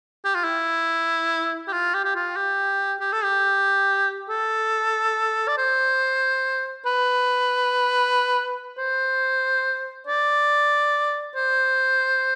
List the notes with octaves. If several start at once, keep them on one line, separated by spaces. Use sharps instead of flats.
G4
F4
E4
G4
F4
G4
G4
F4
G4
G4
A4
G4
A4
D5
C5
B4
C5
D5
C5